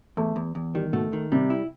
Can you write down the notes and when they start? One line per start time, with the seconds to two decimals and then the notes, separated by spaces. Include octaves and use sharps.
0.17 E2 A3
0.36 E2
0.55 E2
0.74 D#3 G3
0.93 B2 A3
1.13 D#3
1.32 C3 G3
1.50 E4